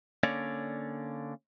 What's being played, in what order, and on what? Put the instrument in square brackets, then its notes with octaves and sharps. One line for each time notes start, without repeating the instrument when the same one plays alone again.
[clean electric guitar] D3 A#3 C#4 C#5 D5